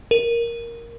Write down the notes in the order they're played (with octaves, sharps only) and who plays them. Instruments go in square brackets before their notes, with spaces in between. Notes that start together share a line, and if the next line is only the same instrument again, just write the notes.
[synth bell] A#4